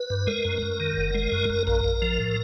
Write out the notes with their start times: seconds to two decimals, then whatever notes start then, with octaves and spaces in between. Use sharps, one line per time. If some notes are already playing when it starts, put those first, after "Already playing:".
Already playing: B4
0.10 G2
0.27 G#3 A#4
0.45 F#2
0.62 F#2
0.80 D#3
0.97 F#1
1.14 G#3
1.32 F#2
1.50 F#2
1.67 A#1 A#4
1.84 A#1
2.02 F3
2.20 A2